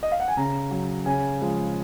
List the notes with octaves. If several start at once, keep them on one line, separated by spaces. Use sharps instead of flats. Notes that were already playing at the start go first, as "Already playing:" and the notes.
D#5
F5
F#5
G#5
C#3 A#5
F#3
C#3 G#5
F3 G#3